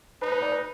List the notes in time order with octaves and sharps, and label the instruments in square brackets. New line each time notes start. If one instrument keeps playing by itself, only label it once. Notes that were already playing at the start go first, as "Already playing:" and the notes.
[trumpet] D#4 [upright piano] B4
[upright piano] B4
D5
B4